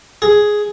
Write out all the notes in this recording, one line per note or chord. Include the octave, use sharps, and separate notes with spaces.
G#4